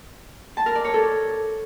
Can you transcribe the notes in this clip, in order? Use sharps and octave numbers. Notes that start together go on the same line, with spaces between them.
A5
A#4
D5
C#5
A4